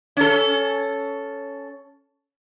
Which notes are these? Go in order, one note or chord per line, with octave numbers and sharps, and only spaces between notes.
C#4 A4